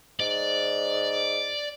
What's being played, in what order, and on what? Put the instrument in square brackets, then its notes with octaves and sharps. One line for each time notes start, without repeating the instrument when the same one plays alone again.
[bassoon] G#2 [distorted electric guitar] D5